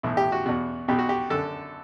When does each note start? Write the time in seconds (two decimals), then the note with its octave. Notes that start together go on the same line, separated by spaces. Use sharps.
0.03 B1 A2 E3 E4
0.17 G4
0.32 F#4
0.46 E2 B2 F#4
0.88 B1 B2 G4
0.99 F#4
1.09 G4
1.30 F#2 D3 A4